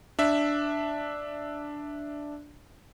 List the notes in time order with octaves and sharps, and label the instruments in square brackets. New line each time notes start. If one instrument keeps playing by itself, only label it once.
[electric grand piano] D4 E5